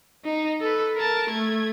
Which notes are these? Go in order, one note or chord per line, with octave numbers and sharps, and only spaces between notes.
D#4
A4 B4
A#4 A5
A3 G#6